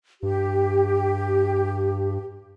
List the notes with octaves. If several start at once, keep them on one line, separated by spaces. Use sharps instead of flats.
G2 G4